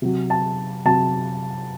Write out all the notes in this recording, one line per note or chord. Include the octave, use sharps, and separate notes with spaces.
C3 F#3
A5
C3 F#3 A5